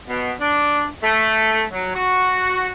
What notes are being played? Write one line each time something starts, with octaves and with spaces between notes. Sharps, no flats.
B2
D4
A3
F#3
F#4